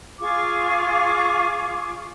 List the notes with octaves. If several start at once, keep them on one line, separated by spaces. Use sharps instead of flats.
F4 G#4 C#6 D6